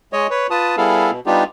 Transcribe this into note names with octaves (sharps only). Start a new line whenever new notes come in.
G#3 C#5 D#5
B4 C#5
F4 B4 A5 D#6
G3 B3 E4 G#4 A4 F5
B2
G3 B3 D4 D#4 F4 G4